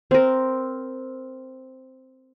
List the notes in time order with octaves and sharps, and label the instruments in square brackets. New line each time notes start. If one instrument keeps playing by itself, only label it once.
[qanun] C4 A#4